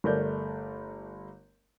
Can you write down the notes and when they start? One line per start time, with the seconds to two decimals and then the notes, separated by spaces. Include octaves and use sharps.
0.04 G1 A3 A#4 D5 G6